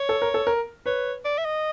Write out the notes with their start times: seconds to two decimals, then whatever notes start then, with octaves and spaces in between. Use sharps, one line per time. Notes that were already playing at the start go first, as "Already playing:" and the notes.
Already playing: C#5
0.09 A4
0.22 A#4
0.34 A4
0.47 A#4
0.86 B4 C#5
1.25 D5
1.38 E5
1.45 D#5